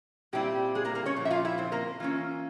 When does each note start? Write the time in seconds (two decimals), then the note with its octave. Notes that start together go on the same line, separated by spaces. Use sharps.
0.33 A#2 G3 C4 E4 G4
0.75 G#3 G#4
0.85 A#3 A#4
0.95 A#3 A#4
1.06 C#4 C#5
1.16 A#2 F3
1.25 E5
1.30 F4 F5
1.45 E4 E5
1.58 C4 C5
1.72 A#3 A#4
2.00 E3 A#3 C#4 F4